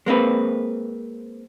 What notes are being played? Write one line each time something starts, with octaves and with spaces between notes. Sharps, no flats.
G#3 A#3 C4 B4